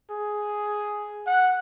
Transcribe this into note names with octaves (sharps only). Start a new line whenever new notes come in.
G#4
F#5